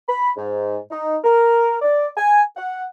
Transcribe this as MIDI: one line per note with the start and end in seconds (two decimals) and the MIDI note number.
0.09 0.31 83
0.37 0.79 44
0.91 1.17 63
1.24 1.77 70
1.82 2.09 74
2.18 2.43 80
2.57 2.85 78